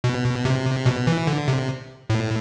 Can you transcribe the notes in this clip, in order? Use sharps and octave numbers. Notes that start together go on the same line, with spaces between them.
B2
C3
B2
E3
D3
C3
A2